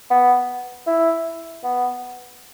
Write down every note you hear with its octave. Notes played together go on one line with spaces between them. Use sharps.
B3
E4
B3